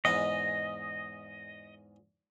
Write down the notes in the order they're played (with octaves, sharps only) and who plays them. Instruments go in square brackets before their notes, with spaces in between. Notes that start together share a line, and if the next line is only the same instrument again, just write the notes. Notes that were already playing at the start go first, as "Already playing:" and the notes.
[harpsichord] E2 G#2 B4 [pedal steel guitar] D#5